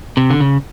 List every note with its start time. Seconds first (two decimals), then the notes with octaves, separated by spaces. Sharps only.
0.17 C3
0.30 D3
0.40 C#3